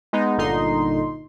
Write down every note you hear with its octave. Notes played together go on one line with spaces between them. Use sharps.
G#3 B3 D#4
G1 A#2 D3 D#4 C6